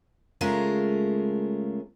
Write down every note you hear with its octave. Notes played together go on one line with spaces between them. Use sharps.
C#3 G#3 A3 F4 A#4